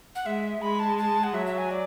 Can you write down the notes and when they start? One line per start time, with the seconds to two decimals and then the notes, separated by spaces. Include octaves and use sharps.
0.15 F#5
0.25 G#3 E5
0.61 G#3 B5
0.79 A5
0.98 A5
1.23 F#5
1.34 F#3 E5
1.46 E5
1.58 G#5
1.70 D5